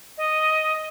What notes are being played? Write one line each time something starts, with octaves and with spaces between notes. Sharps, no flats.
D#5